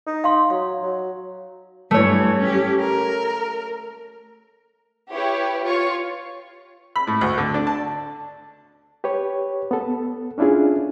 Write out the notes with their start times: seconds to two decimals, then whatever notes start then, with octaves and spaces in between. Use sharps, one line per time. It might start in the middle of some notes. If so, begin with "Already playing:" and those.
0.06 D#4
0.24 F5 C6
0.50 F#3 F5
0.82 F#3
1.91 G2 E3 A3 C#5
2.40 C#4 G4
2.80 A#4
5.10 E4 G4 B4 C#5
5.64 F4 C#5 C#6
6.96 B5
7.07 A2
7.21 D2
7.38 D3
7.54 D4
7.67 A5
9.04 G4 B4 C#5
9.71 B3 A4
10.38 C#4 D4 E4 F4 G#4